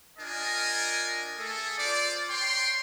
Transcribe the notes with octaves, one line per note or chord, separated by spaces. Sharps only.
D4 F4 A#4 D#5 G#5
A3 G#4 A4
F4 C5 D5
C#5 G5 C6